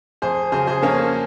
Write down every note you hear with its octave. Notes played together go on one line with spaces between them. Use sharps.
F2 G#4 C5
C#3 F#3 G#4 C5
G#4 C5
F2 A#3 C#4